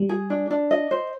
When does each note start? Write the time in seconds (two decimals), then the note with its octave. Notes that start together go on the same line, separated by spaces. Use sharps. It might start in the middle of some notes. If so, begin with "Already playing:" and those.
Already playing: G3
0.09 G#4
0.30 D4
0.51 D4
0.71 D#5
0.91 C5